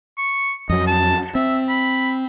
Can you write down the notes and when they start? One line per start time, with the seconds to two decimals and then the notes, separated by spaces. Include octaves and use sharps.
0.18 C#6
0.70 F2 F#3 D#5
0.87 A5
1.35 C4 E5
1.69 B5